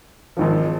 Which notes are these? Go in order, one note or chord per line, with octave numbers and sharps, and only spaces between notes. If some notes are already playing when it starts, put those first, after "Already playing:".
G#1 G#2 F3